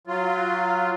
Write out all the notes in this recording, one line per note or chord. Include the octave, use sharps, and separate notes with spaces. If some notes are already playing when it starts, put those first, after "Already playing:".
F#3 F4